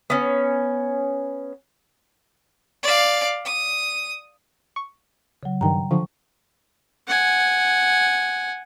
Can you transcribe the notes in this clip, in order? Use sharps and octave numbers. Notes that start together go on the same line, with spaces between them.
B3 C#4
D5 F5
D#6
C#6
C#3 F#3
G2 D#3 G5 A#5
D3 F3 C#6
F#5 G#5